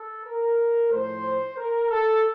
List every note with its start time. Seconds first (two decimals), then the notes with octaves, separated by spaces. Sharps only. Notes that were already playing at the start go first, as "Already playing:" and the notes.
Already playing: A4
0.25 A#4
0.91 A2 F3 A3 C5
1.58 A#4
1.90 A4